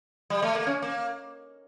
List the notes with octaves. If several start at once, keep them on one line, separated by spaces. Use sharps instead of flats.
G3
A3
A#3
C#4
A#3